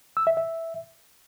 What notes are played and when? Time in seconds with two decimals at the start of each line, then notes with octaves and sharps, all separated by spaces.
0.17 E6
0.27 E5
0.37 E5